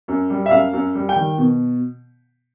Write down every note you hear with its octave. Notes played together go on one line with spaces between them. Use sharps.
F#2
G3
E5
F#2 F5
F#2
G3
G5
D#3
B2